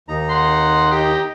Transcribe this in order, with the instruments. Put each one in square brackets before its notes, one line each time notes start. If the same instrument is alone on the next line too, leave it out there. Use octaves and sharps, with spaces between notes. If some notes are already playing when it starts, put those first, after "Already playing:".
[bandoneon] D#2 D#4 A#5
[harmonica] F#5 C6
G4 D#5